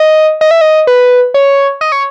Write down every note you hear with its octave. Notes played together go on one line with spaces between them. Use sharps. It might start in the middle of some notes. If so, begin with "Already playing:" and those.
Already playing: D#5
D#5
E5
D#5
B4
C#5
D#5
C#5